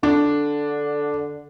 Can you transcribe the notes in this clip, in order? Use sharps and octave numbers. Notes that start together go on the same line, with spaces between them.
D3 D4